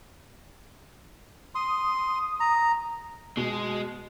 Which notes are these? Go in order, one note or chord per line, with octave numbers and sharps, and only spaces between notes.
C6 D#6
A#5
B2 G#3